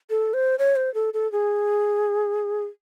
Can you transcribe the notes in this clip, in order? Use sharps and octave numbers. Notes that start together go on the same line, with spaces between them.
A4
C5
C#5
C5
A4
A4
G#4